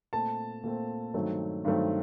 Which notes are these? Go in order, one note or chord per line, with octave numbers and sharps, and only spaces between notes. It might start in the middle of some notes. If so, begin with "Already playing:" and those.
A#2 A3 C4 A5
A#2 A3 C4
G2 D#3 F#3 A3 C4
G2 D#3 F#3 A3 C4